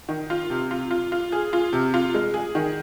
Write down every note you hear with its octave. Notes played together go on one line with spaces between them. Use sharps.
D#3
F4
C3
F4
F4
F4
G#4
F4
C3
F4
G#3
G#4
D#3